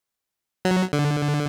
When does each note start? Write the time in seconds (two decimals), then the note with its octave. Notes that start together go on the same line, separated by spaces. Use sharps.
0.65 F#3
0.93 D3